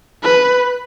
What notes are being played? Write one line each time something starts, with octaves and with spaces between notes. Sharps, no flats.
B4